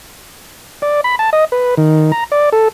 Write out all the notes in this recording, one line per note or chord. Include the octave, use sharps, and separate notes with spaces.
D5
B5
A5
D#5
B4
D#3
A#5
D5
A4